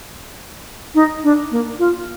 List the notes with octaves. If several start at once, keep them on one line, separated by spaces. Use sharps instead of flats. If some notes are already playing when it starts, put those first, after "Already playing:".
D#4
D4
A#3
F4